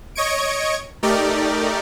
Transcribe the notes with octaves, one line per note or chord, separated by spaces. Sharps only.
C#5 D#5 C#6 G#6 D7
A3 D#4 G4 A#4 D5